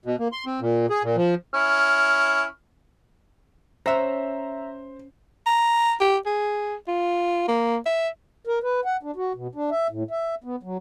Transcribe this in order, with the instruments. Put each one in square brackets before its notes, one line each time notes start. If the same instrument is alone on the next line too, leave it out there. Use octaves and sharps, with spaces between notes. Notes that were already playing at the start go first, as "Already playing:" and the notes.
[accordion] B2
A#3
C6
C4
A#2
G#4
A#2
F3
[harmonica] C#4 E4 F6
[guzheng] C#4 F#5 [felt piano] C5 [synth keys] E5 A#5
[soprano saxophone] A#5
G4
G#4
F4
A#3
E5
[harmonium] A#4
B4
F#5
D4
F#4
B2
D4
E5
A2
E5
B3
F#3